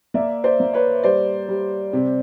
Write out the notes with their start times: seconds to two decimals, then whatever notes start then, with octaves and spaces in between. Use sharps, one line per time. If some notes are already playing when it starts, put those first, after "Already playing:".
0.14 A#3 D5 E5
0.44 C5 D5
0.60 A#3
0.73 B4 C#5
1.04 G3 C5 D5
1.48 G3
1.93 C3